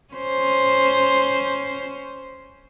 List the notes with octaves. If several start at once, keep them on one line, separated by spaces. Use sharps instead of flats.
C#4 C5